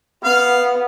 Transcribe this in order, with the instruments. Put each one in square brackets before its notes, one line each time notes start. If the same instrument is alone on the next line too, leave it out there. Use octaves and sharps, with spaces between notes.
[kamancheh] B3 [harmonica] F5